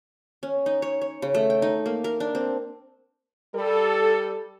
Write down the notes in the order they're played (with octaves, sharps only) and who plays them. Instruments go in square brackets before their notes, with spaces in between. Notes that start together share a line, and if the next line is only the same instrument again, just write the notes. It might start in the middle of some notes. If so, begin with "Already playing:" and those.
[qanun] C#4
D#4
C#5
C#5
C#3
A3
G5
D#4
A#3
A#4
D4
C4
[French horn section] G3 A4